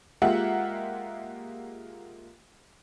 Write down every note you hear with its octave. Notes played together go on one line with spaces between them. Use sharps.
G#3 A#3 F4 G4 E5 F#5